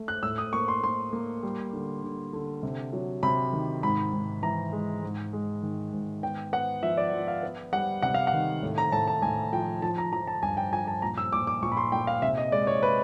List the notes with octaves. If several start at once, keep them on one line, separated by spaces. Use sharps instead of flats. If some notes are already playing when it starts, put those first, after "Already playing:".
Already playing: A3
F#6
A2 E6
D#6
A#3 C#6
C6
A#3 C6
A#3
G3
D3
D3
D3
C3
F#3
C3 B5
D#3
G#2 B5
G#2
E3 A#5
G#3
G#2
G#3
D#3
G#2
B3 G5
B3 F#5
F3 E5
D5
F3
F5
B3
G3 F#5
C3 F#5
F5
F#5
D#3
A2
A#5
A2 A5
A5
A2 G#5
F3 G5
F3 A5
A#5
F3 A#5
A5
G2 G#5
G5
F3 G#5
A5
A#2 A#5
E6
A#2 D6
D6
A#2 C#6
B5
C6
A#2 G5
F5
C3 E5
D#5
G#3 D5
C#5
B4